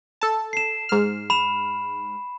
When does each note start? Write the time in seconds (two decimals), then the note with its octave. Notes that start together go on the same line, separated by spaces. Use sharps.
0.21 A4 A5
0.53 C7 E7
0.89 G#2 F6
1.30 B5 E7